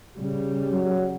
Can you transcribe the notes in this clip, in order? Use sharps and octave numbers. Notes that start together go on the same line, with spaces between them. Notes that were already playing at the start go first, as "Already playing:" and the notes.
C#3 G3
F#3